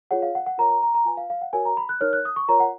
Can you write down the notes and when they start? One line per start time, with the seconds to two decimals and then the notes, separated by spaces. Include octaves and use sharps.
0.11 F4 G#4 C#5 F#5
0.22 F5
0.35 F#5
0.46 F#5
0.58 F4 A#4 C#5 A#5
0.70 A#5
0.83 A#5
0.95 A#5
1.05 F4 B4 G#5
1.17 F5
1.30 F5
1.42 F#5
1.53 F#4 A#4 C#5 G#5
1.65 A#5
1.77 B5
1.89 F#6
2.01 D#4 A#4 C#5 F6
2.13 F#6
2.25 D#6
2.36 C#6
2.48 F4 A#4 C#5 A#5
2.60 F#5